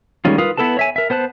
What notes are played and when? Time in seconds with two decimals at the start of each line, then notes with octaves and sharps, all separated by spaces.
0.25 D#3 G3 G#3 C#4 F4
0.38 F4 A#4 B4 F5 D#6
0.57 B3 E4 A4 B4 A5
0.77 C#5 E5 G#5
0.96 A#4 E5
1.10 B3 C5 A5 F#6